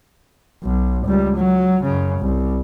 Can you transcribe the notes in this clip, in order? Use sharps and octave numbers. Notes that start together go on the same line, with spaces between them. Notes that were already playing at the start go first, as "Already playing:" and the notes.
B1
C#2 G3
F#3
F#2 C#3
C2